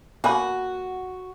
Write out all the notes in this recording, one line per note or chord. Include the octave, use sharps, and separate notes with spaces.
A#3 F#4 G#5 B5